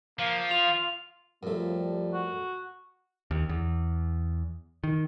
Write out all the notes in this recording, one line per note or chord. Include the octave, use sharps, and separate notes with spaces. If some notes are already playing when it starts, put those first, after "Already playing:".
F3 A#3 F5
F4 F7
F#2 F3 G3 A3
F#4
D#2
E2
D#3